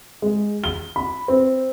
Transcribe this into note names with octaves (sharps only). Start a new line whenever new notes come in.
G#3
G7
B5
C4